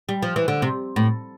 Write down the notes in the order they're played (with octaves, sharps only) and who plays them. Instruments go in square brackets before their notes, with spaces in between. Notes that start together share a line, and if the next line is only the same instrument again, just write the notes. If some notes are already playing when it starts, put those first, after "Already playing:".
[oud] G3
F3
E3
D3
C3
A2